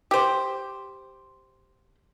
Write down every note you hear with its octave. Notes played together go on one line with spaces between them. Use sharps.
G4 C5